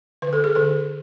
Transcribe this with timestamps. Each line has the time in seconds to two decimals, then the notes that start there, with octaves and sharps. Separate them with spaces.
0.22 D3 B4
0.33 A4
0.44 G#4
0.55 D3 A4